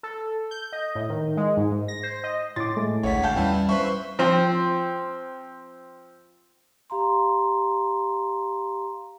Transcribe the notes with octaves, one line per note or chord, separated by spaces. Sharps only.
A4
G6
D#5
A2
D#3
G#3
G#2
G#3
A#6
C5
D#5
A2 C6 D6 A6
G#3 A3 G#4
A1 D2 C#5 F#5 B6
F5 G5 A5 G6
E2 E3 G3 C#4 E4
B4 C5 E5 C#6
F3 C4
G4 F5 A#5 C6